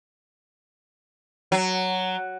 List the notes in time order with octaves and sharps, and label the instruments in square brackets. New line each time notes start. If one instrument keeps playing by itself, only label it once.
[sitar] F#3